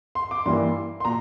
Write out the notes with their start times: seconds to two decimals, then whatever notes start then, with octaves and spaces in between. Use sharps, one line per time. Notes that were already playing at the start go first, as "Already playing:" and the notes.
0.15 C6
0.31 D6
0.46 G2 E3 G3 A#3 E4 C6
1.00 C6
1.05 A#2 A#5